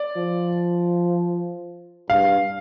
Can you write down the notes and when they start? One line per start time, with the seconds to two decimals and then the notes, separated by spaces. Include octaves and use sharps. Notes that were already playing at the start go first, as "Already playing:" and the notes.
Already playing: D5
0.16 F3
2.10 G2 F5